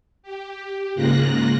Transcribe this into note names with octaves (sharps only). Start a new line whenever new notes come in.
G4
G#2 C#3 A#3 F4 F#6 A#6